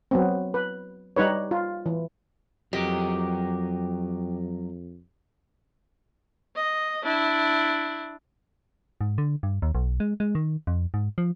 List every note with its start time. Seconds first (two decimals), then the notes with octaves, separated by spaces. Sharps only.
0.11 F#3 B3 C4
0.54 B4
1.16 G3 D#4 B4 C#5
1.51 F4
1.86 E3
2.73 F2 F#3 G4 A#4 D#5
6.56 D#5
7.03 D4 E4
9.01 G#2
9.18 D3
9.43 G2
9.62 D#2
9.75 B1
10.00 G#3
10.20 G#3
10.35 D#3
10.67 F2
10.94 G#2
11.18 F3